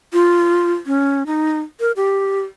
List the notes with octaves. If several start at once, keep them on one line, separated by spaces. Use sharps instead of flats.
F4
C#4
D#4
A#4
G4